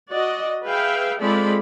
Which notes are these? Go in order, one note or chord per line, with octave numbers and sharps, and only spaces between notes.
F#4 D5 D#5
G#4 B4 E5 F5 G5
G#3 C4 F4 A4 D5 B5